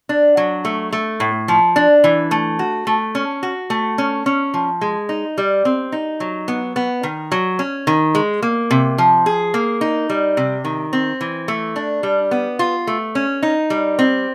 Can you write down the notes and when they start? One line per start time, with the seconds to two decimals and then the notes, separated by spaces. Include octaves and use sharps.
0.09 D4
0.37 F#3
0.65 A3
0.93 A3
1.20 A2
1.48 F3
1.76 D4
2.04 E3
2.31 A3
2.59 F#4
2.87 A3
3.15 C#4
3.43 F#4
3.70 A3
3.98 C#4
4.26 C#4
4.54 F3
4.81 G#3
5.09 D#4
5.38 G3
5.65 C4
5.92 D#4
6.20 F#3
6.48 B3
6.76 B3
7.03 D#3
7.32 F#3
7.59 C#4
7.87 D#3
8.15 G#3
8.42 A#3
8.71 C3
8.98 F3
9.26 G#4
9.54 A#3
9.81 D#4
10.09 G3
10.37 C3
10.65 D#3
10.93 C4
11.21 E3
11.48 A3
11.76 D4
12.03 G3
12.31 B3
12.59 F4
12.87 A3
13.15 C#4
13.42 D#4
13.70 G3
13.99 C4